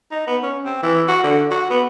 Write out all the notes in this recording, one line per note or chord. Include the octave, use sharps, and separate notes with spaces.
D#4
B3
C#4
C4
E3
F#4
D3
F#4
B3